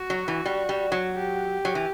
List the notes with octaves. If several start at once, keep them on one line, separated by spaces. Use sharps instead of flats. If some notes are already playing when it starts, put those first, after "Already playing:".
Already playing: F#4
F#3
E3
G3
G3
F#3
G4
F#3
E3